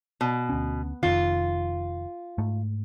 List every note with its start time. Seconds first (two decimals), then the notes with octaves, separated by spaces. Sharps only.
0.21 B2
0.49 D2 C#4
1.03 F1 F2 D#3 F4
2.38 G#2 A3